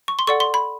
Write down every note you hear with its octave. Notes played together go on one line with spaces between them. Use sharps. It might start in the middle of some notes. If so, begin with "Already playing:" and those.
C#6
C6
A4 D5 F#5 C#6
C6
B5